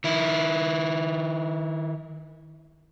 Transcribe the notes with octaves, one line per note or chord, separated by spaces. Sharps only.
D#3 E4